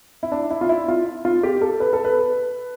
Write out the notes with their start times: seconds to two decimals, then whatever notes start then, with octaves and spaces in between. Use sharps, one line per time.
0.23 E4
0.32 D4
0.50 E4
0.61 F4
0.69 E4
0.88 F4
1.25 F4
1.43 G4
1.61 A4
1.80 B4
1.93 A4
2.04 B4